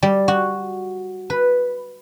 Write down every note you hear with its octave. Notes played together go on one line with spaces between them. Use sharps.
G3
F#4
B4